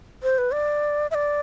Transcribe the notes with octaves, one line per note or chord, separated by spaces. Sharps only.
C5
B4
D5
E5
D5